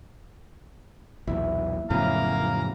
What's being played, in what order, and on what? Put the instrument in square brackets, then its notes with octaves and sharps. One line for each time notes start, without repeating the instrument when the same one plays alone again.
[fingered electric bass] B1 E2 A#2 [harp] E4
[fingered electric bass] F2 A2 C#3 [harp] E3 F#3 B3 [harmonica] F5 A#5